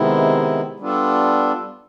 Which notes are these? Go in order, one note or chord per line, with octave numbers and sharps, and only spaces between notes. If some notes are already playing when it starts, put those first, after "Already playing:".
Already playing: C3 D#3 G#3 B3 E4
G3 B3 D4 F4 A4